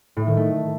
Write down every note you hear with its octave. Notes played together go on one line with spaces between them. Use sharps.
A2
D#3
A3